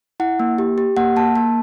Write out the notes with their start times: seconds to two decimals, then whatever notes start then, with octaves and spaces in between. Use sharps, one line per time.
0.20 E4 F#5
0.40 A#3
0.58 G4
0.78 G4
0.97 A#3 F#5
1.16 A#3 A5
1.35 A#3 A5